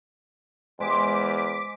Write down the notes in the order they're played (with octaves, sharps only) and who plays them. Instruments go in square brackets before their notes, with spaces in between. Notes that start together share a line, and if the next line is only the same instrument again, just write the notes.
[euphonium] E2 [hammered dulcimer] G#3 C5 G#5 [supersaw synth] D6 B6